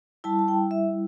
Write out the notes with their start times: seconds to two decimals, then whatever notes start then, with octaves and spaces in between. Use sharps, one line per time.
0.24 G3 E4 A5
0.39 A5
0.48 G5
0.71 E5